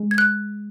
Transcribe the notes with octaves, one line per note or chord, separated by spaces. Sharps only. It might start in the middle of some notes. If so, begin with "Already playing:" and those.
Already playing: G#3
G#6
F#6